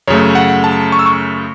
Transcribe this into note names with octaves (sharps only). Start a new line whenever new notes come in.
F#2 C#3 A3 C#5
F#5
A5
C#6
E6
C#6